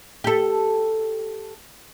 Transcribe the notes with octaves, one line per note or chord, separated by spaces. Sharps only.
G4 A4